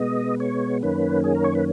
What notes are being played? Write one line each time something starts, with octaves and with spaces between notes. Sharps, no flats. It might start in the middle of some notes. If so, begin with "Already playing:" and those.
Already playing: B2 G#3 B3 D#5
C#5
F#2 D#3 A#3 C#4 B4
G#4
A#4
C#5
B4